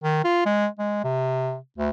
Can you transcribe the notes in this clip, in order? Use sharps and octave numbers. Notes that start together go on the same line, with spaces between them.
D#3
F4
G#3
G#3
C3
D2